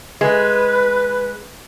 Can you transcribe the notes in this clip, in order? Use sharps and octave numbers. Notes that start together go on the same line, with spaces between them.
G#3 B4